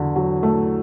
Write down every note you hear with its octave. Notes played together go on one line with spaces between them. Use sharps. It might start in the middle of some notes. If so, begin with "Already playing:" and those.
Already playing: E2 D3 F#3
F#3
A3